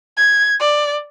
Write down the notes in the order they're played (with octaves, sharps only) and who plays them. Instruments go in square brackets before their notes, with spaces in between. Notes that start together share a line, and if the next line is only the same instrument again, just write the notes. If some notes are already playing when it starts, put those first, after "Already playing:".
[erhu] G#6
D5